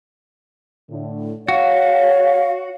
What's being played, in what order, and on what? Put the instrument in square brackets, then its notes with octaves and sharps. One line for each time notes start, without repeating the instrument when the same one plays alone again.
[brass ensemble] A2 D3
[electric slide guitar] F#4 [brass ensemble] C#5 [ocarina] F5